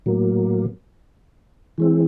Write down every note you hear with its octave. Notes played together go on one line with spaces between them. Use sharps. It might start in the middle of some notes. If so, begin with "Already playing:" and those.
A2 F#3 A#3
E3 G#3 C4